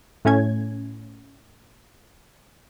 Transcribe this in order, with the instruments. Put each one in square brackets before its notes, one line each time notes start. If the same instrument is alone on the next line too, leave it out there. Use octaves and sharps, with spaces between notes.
[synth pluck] A2 A3 C#4 G#6